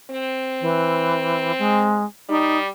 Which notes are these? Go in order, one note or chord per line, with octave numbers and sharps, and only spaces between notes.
C4
E3
G#3
G3 D#4